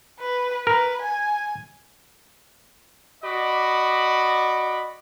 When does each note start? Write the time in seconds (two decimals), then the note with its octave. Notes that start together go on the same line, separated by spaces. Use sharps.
0.20 B4
0.67 A#4 B4
1.02 G#5
3.24 F#4 D5 D#5 B5 D6